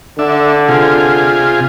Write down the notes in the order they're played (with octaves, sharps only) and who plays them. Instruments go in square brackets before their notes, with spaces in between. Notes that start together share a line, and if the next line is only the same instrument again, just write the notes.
[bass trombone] D3 [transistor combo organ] D4 E5
[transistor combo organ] C3 F4 G#4